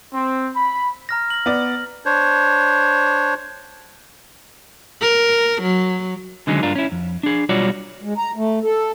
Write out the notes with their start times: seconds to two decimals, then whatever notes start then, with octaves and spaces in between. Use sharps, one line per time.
0.13 C4
0.54 B5
1.09 A#5 F6 A#6
1.30 A#6 F#7
1.46 B3 D5
2.05 D4 C5 C#5
5.01 A#4
5.62 F#3
6.47 D3 D#3 F#3 G#3 C#4
6.63 G2 D4 F4 A#4
6.76 C#4 E4
6.92 F2
7.23 D4 G#4
7.49 B1 G3 F4 F#4 C#5 D5
8.03 G#3
8.18 A#5
8.36 A3
8.63 A4